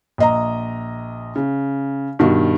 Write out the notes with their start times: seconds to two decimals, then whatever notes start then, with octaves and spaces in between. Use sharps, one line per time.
0.18 A#1 D#5 A#5
1.35 C#3
2.19 G2 B2 D#3 F#4